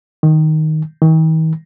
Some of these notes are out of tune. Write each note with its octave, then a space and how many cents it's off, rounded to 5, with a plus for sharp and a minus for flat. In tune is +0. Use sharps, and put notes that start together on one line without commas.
D#3 +5
D#3 +45